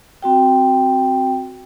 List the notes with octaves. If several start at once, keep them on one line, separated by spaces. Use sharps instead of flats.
C4 F#4 G5